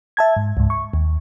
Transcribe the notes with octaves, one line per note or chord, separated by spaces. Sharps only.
E5 A5 G#6
G#2
C#2 G#2
C#6
D#2